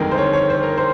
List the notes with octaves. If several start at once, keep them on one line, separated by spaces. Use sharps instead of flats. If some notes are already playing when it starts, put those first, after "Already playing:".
Already playing: G1 F2 D#3 G#3 A#4
C5
C#5
C#5
C5
A#4
C5